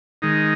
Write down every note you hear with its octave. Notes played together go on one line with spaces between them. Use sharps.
D#3 G#3 D#4